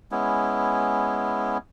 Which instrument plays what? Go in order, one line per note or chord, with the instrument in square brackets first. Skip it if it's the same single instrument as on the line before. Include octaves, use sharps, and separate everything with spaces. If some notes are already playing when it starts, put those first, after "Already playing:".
[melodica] G#3 B3 C#4 E4